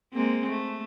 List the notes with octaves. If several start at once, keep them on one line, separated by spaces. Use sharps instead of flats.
G#3 A#3 C4
A3